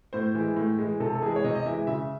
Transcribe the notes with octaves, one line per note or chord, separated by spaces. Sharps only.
A2 C5
E3 G#3
A2
E3 G#3
C3 A4
A4
E3 G#3 G#4
C#5
C3 D#5
D#5
E3 G#3 E5
C#3 E5